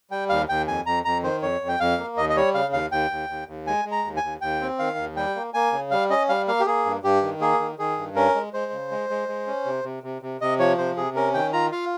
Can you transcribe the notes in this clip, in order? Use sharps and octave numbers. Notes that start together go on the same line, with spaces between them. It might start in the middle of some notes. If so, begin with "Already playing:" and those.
G3 G5
D#2 F5
D#2 G5
F2 G#5
F2 A#5
F2 A#5
D#3 C5
F2 C#5
F2
G5
F2 F5
A#3
D#2 D#5
D#5
G3 C#5
C#3 F5
D#2 F5
D#2 G5
D#2
D#2
D#2
G#3 G#5
G#3
A#5
D#2
G#5
D#2
D#2 G5
C4
D#3 F5
D#2
G3 G5
A#3
A#3 G#5
C#3
G3 F5
C#4 D#5
G3 F5
A#3 F5
G4
A#3 G#4
G2
G2 G4
D#3
A#3 G#4
D#3
D#3 G#4
G2
C#4 A#4
G#3
G#3 C5
C#3
G#3
G#3
G#3
C#4
C3
C3
C3
C3
C3 D#5
F3 C#5
C3 C5
C3 G#4
C#4 A#4
D#3 G5
F4 A#5
F4 F5